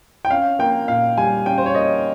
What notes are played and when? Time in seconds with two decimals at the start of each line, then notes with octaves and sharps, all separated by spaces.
0.25 G5
0.30 C#4 F5
0.59 A#3 G5
0.88 A#2 F5
1.17 G3 G#5
1.46 C#4 G5
1.58 C5
1.66 C#5
1.75 A#3 D#5